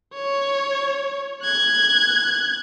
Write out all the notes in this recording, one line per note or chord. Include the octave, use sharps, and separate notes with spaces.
C#5
F#6 G#6